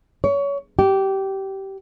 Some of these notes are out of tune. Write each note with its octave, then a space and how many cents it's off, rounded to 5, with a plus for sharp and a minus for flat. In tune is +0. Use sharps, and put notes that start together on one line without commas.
C#5 +25
G4 -20